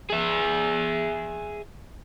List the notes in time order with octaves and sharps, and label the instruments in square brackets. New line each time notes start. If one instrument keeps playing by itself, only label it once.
[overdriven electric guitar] G#4 E5